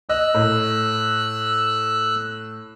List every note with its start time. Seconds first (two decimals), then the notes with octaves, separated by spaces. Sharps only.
0.09 D#5 E6 F#6
0.34 A2